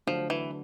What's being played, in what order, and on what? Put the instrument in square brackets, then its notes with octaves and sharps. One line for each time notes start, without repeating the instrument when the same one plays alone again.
[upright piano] D3 F#3 A3 [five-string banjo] F3
[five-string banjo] E3